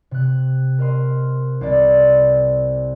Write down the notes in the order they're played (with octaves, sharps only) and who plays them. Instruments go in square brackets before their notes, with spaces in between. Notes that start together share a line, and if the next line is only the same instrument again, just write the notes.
[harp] C3 F#6
A#4 D#5 C6
C2 C4 D5